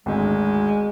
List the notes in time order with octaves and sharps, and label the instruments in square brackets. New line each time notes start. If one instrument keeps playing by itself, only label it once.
[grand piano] G#1 D2 [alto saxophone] G#3